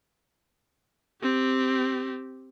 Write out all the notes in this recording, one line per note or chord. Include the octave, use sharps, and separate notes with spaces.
C4 G4